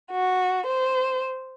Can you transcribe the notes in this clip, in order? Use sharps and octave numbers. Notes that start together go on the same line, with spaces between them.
F#4
C5